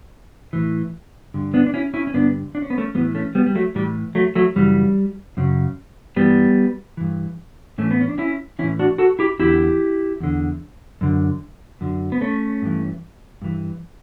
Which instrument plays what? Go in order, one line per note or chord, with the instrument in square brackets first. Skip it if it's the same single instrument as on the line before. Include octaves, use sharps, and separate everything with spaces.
[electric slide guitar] A2 E3
G2 D3
B3 D4
D4
C#4 E4
C#4 E4
C#4
G2 D3 B3 D4
D4
C#4
B3
A3 C#4
A2 G3 B3
E3
A3 C#4
G3 B3
G3
F#3 A3
A2 E3 G3
F#3 A3
F#3 A3
F#2 C#3 E3 G3
F#2 C#3
G2 E3 G3 B3
G2 E3
A2 E3 A3 C#4
B3
C#4
D4
C#4 E4
E3 C#4 E4
A2
D4 F#4
F#4 A4
E4 G4
E2 D3 E4 G4
E2 D3
F#2 D3
F#2 D3
B3
A3 C#4
G2 E3
G2 E3